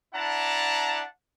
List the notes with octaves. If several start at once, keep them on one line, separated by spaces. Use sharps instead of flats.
D4 E4 F#5 A5 A#5